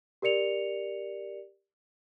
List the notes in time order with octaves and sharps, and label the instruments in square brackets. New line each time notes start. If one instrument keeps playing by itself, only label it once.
[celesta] G4 A#4 D5 C#7 F7